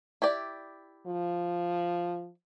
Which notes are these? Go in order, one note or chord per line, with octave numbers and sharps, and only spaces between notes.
E4 G4 D5
F3